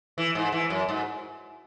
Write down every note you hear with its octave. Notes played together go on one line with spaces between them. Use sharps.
E3
G#2
E3
F#2
G#2